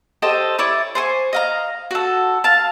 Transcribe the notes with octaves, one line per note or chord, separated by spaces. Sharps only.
G4 A4 C5 D#5
E4 C#5 D5
C5 G#5 C#6
D#5 F5 A#5
F#4 A4
F5 A5